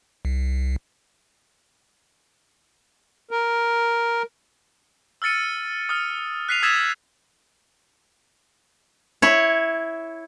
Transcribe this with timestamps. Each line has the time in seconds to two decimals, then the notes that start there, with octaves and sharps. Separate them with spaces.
0.25 C2
3.31 A#4
5.22 E6 F6 A6 C#7 D#7
5.89 D#6 F6
6.49 F#6 B6 C7 D#7 F7
6.63 D#6 E6 G#6 A6 B6 E7
9.22 E4 C#5